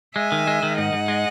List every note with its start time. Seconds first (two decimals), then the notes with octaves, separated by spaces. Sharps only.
0.15 G#3 E5 G#5
0.32 D#3
0.47 G#3
0.63 D#3
0.78 G#2 D#5 F#5
0.93 G#2
1.08 G#3